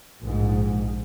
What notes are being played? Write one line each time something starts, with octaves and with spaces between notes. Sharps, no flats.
A#1 G#2